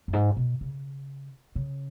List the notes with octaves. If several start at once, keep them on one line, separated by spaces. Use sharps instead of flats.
F#2
G#2
B2
C#3
C#3